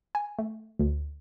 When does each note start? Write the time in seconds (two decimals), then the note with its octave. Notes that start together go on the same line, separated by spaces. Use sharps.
0.15 G#5
0.39 A3
0.79 D2